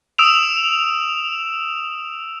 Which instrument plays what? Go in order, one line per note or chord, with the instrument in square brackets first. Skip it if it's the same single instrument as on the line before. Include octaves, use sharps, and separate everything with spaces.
[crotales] D#6 E6 D7 E7 F7